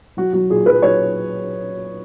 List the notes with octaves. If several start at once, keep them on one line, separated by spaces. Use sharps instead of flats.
F#3 F#4
F#3 F#4
A#2 G#4
F#3 B4
F#3 C#5